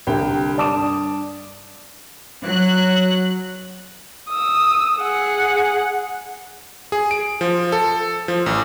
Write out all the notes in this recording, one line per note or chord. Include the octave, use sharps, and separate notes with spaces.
C2 D3 G5
G2 D5 A5 D6 D#6 E7
F#3 F#6
D#6 E6
G#4 F#5
G#4
D7
F3
A4
F3
A1